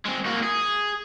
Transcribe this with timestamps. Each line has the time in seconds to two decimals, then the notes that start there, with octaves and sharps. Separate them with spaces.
0.05 G#3 C4
0.25 A#3 F#4
0.43 G#4